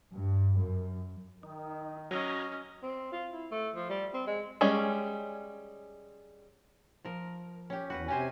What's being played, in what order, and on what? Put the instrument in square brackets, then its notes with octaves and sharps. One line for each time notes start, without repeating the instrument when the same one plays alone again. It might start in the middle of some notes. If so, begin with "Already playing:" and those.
[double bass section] G2
F#2
[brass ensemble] D#3 [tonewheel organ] D#4
[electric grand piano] F#3 [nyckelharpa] C#4 D#5 [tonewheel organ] A#5 F6 G#6
[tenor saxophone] C4
F4
E4
A3
F3
G3
C4
G#3
[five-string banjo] G3 G#3 C#4 C#5
[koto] F3 A#4
C#4 G4
[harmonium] E2 [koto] F#4 B4 F#5
[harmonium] C3 G#5 [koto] C#4 G4 C5